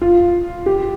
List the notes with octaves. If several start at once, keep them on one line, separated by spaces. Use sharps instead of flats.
F4
G4